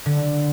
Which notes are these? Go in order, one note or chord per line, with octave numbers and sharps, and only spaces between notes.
D3